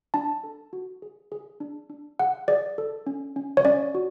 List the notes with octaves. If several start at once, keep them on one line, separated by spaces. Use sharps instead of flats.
D4 A5
A4
F#4
G#4
G#4
D4
D4
G#4 F#5
G#4 D5
A4
C#4
C#4
C#5
C#4 D5
F#4